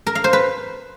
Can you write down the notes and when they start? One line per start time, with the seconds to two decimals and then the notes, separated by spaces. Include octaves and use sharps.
0.07 A#4
0.15 F5
0.24 C5
0.33 B4